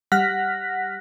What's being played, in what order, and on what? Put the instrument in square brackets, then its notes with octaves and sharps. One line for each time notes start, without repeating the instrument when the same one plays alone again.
[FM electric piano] G3 F#5 F6 F#6 A#6 B6